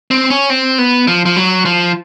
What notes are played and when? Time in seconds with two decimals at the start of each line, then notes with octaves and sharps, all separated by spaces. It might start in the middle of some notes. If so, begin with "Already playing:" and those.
0.11 C4
0.30 C#4
0.50 C4
0.78 B3
1.07 F3
1.26 F3
1.36 F#3
1.65 F3